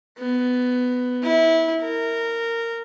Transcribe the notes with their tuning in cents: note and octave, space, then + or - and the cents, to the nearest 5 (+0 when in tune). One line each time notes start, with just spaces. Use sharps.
B3 +15
E4 -20
A#4 -15